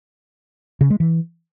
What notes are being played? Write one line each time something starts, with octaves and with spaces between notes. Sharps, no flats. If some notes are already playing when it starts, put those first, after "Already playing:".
C#3
G#3
E3